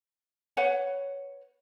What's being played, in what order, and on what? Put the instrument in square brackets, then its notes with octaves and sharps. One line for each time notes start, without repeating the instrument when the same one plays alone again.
[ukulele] B4 C#5 F#5